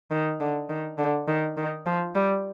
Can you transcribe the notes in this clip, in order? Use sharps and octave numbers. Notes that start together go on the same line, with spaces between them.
D#3
D3
D#3
D3
D#3
D#3
F3
G3